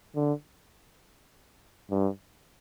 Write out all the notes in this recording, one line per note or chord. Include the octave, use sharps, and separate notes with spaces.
D3
G2